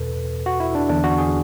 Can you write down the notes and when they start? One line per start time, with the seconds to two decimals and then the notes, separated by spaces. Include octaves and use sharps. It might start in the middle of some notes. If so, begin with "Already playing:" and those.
Already playing: E2 B2 A4 B4
0.46 F#4
0.60 E4
0.75 D4
0.89 E2 D3 D4
1.04 F#4
1.18 G#4